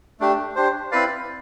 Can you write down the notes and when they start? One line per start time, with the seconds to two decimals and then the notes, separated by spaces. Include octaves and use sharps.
0.20 A3 D4 G4
0.56 D4 G4 C5
0.92 C4 E4 B4 D5 F5